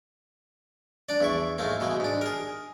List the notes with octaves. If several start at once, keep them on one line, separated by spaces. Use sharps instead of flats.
D4 D5
E2 E4 C#6
G#2 A3 A#3
B2 E3 G#3
G#2 D4
G#4 A#4